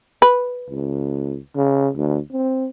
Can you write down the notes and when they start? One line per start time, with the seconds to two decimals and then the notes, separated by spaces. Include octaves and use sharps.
0.22 B4
0.70 C#2
1.56 C#3
1.96 D2
2.32 C4